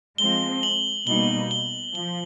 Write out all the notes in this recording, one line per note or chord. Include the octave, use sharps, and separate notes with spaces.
F3 G#3 C4 G7
F#7
B2 G3 A#3 D#4 G7
G7
F3 G7